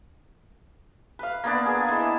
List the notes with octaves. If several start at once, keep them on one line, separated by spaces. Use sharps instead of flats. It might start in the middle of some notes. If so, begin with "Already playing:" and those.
B4 F5
A#3 B3 D4
G#4
E3 G#3 E4